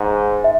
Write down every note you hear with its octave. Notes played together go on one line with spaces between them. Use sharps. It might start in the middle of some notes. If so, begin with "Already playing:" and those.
Already playing: G#2
E5